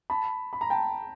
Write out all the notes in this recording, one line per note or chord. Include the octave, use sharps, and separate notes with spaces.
A5 B5
B5
A#5
G5 A5